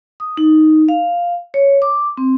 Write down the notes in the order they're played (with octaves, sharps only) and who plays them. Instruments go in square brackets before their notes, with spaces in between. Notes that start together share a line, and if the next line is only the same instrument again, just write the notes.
[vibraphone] D#6
D#4
F5
C#5
D6
C4